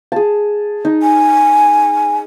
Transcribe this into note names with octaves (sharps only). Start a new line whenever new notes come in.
G#4 A5
D#4
G#5